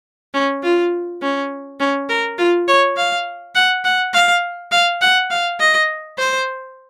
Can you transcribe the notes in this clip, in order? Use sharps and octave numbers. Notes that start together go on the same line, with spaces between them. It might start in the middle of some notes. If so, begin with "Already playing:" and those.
C#4
F4
C#4
C#4
A#4
F4
C#5
F5
F#5
F#5
F5
F5
F#5
F5
D#5
C5